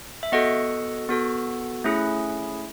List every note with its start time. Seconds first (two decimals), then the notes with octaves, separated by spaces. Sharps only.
0.23 E5
0.32 B3 F#4 A4 D#5 F#5
1.09 B3 F#4 A4
1.84 A3 C#4 E4 G#4